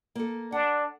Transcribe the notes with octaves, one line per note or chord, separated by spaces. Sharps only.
A#3 A4
D4 F#5